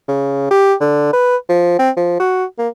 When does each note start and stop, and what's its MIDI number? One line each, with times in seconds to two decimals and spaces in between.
0.08 0.48 49
0.51 0.74 67
0.81 1.09 50
1.13 1.36 71
1.49 1.75 53
1.79 1.90 60
1.97 2.17 53
2.20 2.44 66
2.59 2.69 58